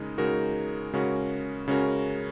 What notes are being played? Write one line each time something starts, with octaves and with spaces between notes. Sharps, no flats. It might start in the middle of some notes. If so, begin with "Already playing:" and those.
Already playing: C#3 G#3 D#4 A#4
C#3 G#3 D#4 F#4 A#4
C#3 G#3 C#4 F#4 A#4
C#3 G#3 C#4 F#4 A#4